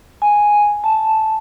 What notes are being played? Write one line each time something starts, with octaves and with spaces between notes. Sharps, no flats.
G#5
A5